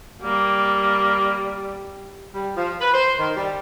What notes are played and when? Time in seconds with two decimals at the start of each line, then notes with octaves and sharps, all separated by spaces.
0.22 G3 A#3
2.34 G3
2.56 F3
2.81 B4
2.94 C5
3.19 D#3
3.36 G3